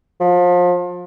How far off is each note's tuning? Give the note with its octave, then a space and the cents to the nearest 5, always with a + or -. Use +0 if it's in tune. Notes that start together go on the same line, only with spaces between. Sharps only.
F3 +30